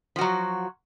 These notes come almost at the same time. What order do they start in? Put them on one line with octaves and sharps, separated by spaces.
F3 F#4 F#3